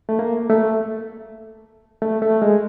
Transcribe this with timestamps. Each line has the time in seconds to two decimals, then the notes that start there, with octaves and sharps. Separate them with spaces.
0.09 A3
0.19 A#3
0.49 A3
2.02 A3
2.22 A3
2.42 G#3